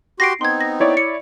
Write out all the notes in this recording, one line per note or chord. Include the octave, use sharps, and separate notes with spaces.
F#4 G4 C6 A#6 C7 D7
B3 C4 D#4 C6 G#6
A#6
E4 C#5 D5
C#7